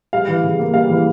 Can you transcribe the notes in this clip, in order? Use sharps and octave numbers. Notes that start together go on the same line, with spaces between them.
G3 F5
E3
C#3
A#3
G3 F5
E3